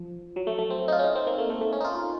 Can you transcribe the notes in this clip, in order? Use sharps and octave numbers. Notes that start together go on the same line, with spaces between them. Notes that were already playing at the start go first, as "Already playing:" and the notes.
Already playing: F3
F#3
A3
A3
C4
D#4
F4
C#4
D#4
C4
A#3
A3
A3
A3
C#4
D#4
F4
F4